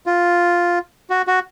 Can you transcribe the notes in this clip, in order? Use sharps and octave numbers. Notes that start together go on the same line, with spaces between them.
F4
F#4
F#4